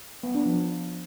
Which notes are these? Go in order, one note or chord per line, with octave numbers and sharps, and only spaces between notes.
B3
D4
F3